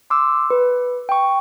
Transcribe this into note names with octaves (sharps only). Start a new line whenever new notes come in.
C6 D6 E6
B4
G5 C#6